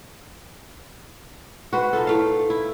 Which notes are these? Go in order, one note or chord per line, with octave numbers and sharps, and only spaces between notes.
F#4 B4 C5
D#4 F4 A4
A2 A3 F5
E4